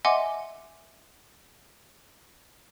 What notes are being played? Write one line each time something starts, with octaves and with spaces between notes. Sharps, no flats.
D#5 E5 F#5 G#5 C6 D6